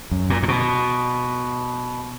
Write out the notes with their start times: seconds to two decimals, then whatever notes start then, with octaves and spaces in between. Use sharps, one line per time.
0.11 F#2
0.30 A#2
0.43 A#2
0.48 B2